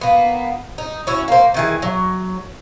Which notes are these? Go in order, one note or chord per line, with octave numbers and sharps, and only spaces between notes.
A#3 B3
D#4
C#4 E4 F#4
A#3 C5
D#3 E3 G#4
F#3